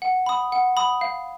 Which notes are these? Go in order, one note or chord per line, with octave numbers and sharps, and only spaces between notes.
F#5
B5 D#6
F#5
B5 D#6
F5